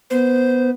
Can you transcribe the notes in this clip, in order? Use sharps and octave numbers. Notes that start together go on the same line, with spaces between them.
B3 C5